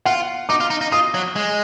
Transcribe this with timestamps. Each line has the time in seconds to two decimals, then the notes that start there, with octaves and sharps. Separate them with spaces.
0.05 F4 F#5
0.49 D#4 D6
0.60 F4
0.70 D#4
0.81 D#4
0.92 F4 D#6
1.14 F#3
1.36 G#3